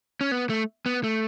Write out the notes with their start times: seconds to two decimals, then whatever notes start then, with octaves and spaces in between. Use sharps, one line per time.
0.21 C#4
0.32 B3
0.50 A3
0.86 B3
1.04 A3